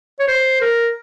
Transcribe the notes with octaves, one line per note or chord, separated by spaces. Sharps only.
C#5
C5
A#4